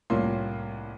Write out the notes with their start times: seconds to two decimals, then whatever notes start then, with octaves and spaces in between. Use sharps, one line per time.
0.10 C2 A2 A#3 C#4 F4 C6